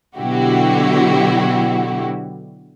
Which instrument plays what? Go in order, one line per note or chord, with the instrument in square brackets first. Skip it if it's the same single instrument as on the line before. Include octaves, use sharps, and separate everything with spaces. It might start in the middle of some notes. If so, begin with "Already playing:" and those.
[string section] B2 D3 F#3 E4 F#4 G4